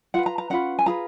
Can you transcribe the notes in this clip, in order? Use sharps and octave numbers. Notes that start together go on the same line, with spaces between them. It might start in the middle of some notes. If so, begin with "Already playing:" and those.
F4 B4 F#5
A#5
A#5
C#4 F4 B4 F#5
G#5
F4 G#4 B4 A#5